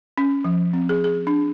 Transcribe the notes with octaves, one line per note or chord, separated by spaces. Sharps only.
C#4
F3
C4
G#4
G#4
D4